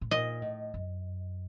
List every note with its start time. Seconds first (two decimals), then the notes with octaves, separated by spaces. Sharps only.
0.01 A2
0.11 A#2 D#5
0.42 A2
0.74 F#2